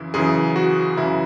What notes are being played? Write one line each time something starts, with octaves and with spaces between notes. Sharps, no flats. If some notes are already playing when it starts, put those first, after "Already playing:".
Already playing: F#2 C#3 E3 E4
F#2 C#3 E3 G#4
F#4
F#2 C#3 E3 E4